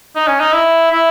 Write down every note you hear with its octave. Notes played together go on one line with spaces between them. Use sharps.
D#4
C#4
D#4
E4
E4